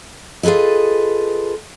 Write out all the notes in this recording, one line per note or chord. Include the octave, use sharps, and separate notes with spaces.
F4 G#4 A4 B4 D#5